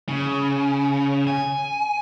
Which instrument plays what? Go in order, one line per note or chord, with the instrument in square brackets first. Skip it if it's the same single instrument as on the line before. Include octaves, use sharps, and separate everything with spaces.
[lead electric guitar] C#3
G#5